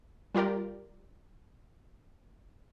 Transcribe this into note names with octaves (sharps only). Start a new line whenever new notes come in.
G3 F4 G4 A#4 D5